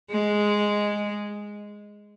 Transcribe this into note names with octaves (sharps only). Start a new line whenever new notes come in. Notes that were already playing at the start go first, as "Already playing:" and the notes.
G#3